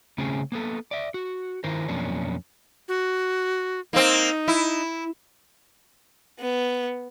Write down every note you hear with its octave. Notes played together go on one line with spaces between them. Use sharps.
C#3 A3 C4 C#4 G#4
A#3 B3 A4
D5 E5
F#4
D#3 E4 A#4 C5
F2 B2 F#3 A#3 C#4 D4
F#4
A#3 C4 D#4
E4
B3